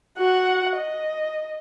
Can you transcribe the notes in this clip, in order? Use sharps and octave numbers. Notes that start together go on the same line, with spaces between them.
F#4 F#5
D#5